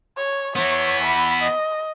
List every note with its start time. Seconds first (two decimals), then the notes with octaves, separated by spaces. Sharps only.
0.16 C#5
0.56 E3 B3 C#5
1.04 B5
1.42 D#5